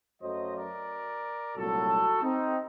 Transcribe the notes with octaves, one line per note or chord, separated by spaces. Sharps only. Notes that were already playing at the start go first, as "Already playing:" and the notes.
F#2 F#3 A3 C5 D#5
A#4 D5
C2 A#2 F#3 A3 F#4 A4
C4 D#4